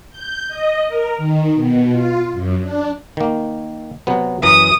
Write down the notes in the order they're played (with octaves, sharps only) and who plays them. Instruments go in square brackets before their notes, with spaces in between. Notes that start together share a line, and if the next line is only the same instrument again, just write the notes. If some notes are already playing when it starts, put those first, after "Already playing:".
[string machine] G6
D#5
A#4
D#3
B2
F4
F#2
D4
[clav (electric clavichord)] D#3 A#3
C3 F#3 B3
[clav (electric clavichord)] F#2 E3 A#5 [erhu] D#6